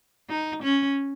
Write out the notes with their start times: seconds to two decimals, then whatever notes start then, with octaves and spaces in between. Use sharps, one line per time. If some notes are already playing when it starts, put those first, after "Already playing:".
0.29 D#4
0.63 C#4